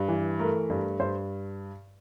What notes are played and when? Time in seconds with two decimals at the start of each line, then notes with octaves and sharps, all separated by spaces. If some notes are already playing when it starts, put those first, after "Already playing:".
Already playing: G2
0.08 E3
0.39 A3 A#4
0.70 G2
1.00 G2 C5